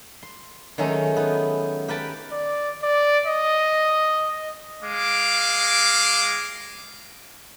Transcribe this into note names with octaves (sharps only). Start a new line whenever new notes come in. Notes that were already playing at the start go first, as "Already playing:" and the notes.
C6
D#3 F#3 G#3 A3 C#4 D#4
B3 D#4
G4 A#4 B4 F#5 G5 A5
D5
D5
D#5
G#3 F5 D6